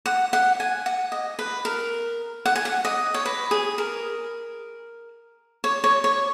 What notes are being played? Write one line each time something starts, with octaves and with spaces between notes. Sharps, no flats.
F#5
F#5
G#5
F#5
D#5
B4
A#4
F#5
G#5
F#5
D#5
C#5
B4
G#4
A#4
C#5
C#5
C#5